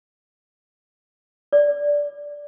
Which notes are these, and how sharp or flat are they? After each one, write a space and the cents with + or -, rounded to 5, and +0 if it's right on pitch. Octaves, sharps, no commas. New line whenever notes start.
D5 -10